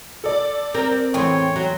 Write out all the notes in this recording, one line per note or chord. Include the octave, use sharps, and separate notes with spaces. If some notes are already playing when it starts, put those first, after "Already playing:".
A4 D5
C4 A#4
E2 A2 C#5 G5 G#5 C6
F#3